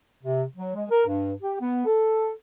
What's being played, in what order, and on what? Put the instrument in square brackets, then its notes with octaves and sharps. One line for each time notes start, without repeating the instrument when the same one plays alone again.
[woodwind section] C3
F#3
G#3
A#4
G2
G4
B3
A4